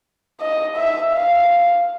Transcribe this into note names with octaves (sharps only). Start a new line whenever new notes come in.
D#5
E5
F5